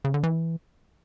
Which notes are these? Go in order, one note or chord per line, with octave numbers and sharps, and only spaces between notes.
C#3
D3
E3